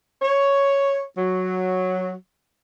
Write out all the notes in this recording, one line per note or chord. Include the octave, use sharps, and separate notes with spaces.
C#5
F#3